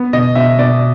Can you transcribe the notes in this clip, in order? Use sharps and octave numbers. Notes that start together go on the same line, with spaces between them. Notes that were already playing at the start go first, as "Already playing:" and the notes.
Already playing: B3
B2 D#5
B2 E5
B2 D5